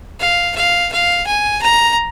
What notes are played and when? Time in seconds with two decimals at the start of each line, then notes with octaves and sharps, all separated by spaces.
0.20 F5
0.56 F5
0.92 F5
1.27 G#5
1.62 A#5